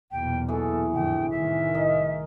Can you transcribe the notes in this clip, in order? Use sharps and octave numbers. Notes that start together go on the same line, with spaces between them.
B1 E2 A#2 G5
E3 F#4 G#4 A4
F2 A2 D3 G5
C2 A2 D#3 E5
A#4 D#5